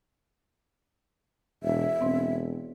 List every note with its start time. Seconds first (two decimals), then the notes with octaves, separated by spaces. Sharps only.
1.63 E1 E5
2.01 E1 B3 C4